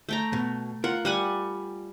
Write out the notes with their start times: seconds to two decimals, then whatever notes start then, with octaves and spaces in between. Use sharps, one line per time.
0.09 A3 G5 A#5
0.33 B2
0.84 F4 A#4 F#5
1.05 G3 F#5 G#5